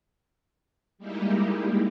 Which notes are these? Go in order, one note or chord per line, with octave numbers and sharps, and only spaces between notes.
G3 G#3 A#3 D#4 E4 G4